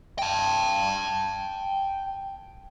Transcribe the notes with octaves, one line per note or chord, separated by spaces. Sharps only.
G5 A5